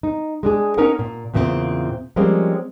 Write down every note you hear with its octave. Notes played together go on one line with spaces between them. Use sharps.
D#4
G#3 D4 G#4
C#4 D#4 A#4 F#5
A#2
E2 A#2 C#3 F3 C4 E5
F3 G3 G#3 A#3 C4 C#4